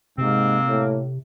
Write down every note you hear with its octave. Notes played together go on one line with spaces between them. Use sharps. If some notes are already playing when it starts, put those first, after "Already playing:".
G#2 C3 A#3 C4
A2